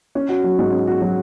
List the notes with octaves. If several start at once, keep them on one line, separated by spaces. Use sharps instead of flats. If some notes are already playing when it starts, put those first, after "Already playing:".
C#4
F#4
F#3
G#2
C#4
F#4
F#3